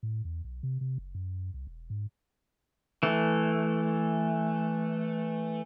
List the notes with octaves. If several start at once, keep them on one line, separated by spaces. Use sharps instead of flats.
A2
E2
B1
C3
C3
F#1
F#2
C2
E1
G#2
E3 A3